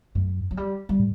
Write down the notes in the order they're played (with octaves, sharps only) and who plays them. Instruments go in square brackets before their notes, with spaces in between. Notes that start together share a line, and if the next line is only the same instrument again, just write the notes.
[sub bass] F#2 [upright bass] A3
[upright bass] F#3
G3
G3
[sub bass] A2